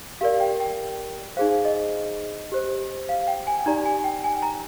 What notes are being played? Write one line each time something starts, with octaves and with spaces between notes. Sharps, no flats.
G4 A#4 D5 F5
G5
G5
D#4 G#4 C5 F5
D#5
G4 C5
F5
G5
G#5
D#4 G4 D5 A#5
G#5
G5
G#5
A#5